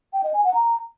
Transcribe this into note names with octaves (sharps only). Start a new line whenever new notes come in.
G5
D#5
G#5
F#5
A#5